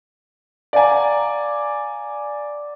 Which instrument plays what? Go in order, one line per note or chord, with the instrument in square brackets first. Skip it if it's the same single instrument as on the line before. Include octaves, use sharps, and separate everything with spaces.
[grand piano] D5 G#5 [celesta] F5 F#5 A#5